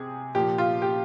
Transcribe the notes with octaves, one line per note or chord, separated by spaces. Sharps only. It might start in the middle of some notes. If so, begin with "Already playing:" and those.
Already playing: C3 G#4
A#2 F3 G4
F4
G4